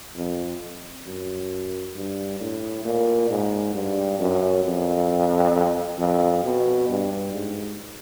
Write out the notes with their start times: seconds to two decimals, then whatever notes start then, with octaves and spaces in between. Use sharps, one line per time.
0.15 F2
1.06 F#2
1.96 G2
2.40 A2
2.85 A#2
3.30 G#2
3.74 G2
4.19 F#2
4.64 F2
5.98 F2
6.43 B2
6.89 G2
7.34 G#2